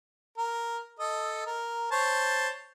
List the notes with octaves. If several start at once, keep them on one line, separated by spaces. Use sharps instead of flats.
A#4
A4 D#5
A#4
C5 C#5 A5